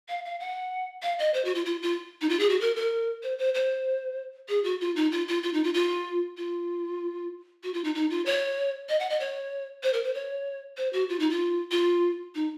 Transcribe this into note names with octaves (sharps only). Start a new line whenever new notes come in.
F5
F5
F#5
F5
D#5
C5
F#4
F4
F4
F4
D#4
F4
G#4
F#4
A#4
A#4
C5
C5
C5
G#4
F#4
F4
D#4
F4
F4
F4
D#4
F4
F4
F4
F#4
F4
D#4
D#4
F4
C#5
D#5
F#5
D#5
C#5
C5
A#4
C5
C#5
C5
F#4
F4
D#4
F4
F4
D#4